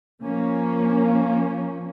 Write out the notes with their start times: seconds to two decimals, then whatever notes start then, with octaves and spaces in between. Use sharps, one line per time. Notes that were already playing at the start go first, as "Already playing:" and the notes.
0.21 F3 A#3 C#4